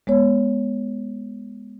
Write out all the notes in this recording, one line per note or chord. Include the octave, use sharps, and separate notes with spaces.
G#3 B3 C#5